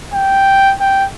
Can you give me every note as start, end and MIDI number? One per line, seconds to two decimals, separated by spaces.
0.14 0.74 79
0.80 1.05 79